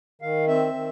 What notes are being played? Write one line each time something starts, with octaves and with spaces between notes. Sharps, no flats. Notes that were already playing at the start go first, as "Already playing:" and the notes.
D#3 F5
C4 E5
D#3